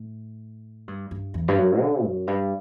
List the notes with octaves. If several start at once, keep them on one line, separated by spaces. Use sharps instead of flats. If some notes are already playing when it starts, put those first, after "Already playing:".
Already playing: A2
G2
G2
E2
G2
F#2
D3
F#2
G2